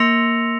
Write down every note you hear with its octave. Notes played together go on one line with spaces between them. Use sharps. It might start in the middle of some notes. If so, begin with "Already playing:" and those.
Already playing: A#3 C6 E6 A#6 C#7 F7